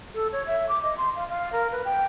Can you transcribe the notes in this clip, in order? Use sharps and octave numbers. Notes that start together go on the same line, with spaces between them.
A4
C#5
E5
D6
D#5
C6
F5
F5
A#4
B4
G5